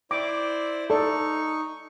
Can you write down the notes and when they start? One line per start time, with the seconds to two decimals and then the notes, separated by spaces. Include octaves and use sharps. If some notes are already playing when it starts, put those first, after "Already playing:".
0.11 E4 C5 D5 D6
0.90 D#4 A4 D5 C#6